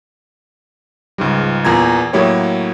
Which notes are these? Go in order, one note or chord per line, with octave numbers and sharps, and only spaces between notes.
C#2 G#2 G3
E2 A#2 A#5 G#6
A2 F#3 A#3 E4 G4 C#5